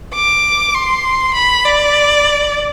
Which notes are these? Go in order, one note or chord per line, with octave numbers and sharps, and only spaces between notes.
D6
C6
B5
D5